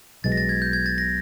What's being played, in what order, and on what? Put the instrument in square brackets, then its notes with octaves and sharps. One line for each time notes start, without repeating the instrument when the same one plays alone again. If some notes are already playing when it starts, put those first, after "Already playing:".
[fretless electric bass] B1 B2 G#3 [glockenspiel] A6
[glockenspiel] A#6
A6
G#6
G6
G#6
A6
A#6